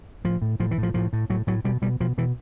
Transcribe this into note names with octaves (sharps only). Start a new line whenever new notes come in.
A2 F3
A2
A2 F3
E3
A2
F3
A2 F3
A2
A2 F#3
A2 F#3
B2 G3
B2 G3
B2 F3
B2 E3